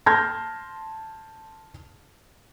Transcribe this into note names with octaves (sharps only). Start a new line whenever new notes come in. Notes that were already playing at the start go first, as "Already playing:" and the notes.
A5 C6 F6 G6 G#6 A#6